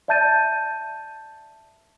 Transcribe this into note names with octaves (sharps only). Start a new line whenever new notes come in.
D5 E5 A5 G6 A6 D#7